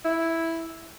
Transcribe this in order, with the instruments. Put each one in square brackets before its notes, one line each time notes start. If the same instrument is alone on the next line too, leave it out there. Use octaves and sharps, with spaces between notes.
[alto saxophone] E4